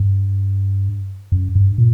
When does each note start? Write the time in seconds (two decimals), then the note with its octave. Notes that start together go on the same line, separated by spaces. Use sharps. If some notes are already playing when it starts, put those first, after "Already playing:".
Already playing: G2
1.32 F#2
1.55 G2
1.78 A#2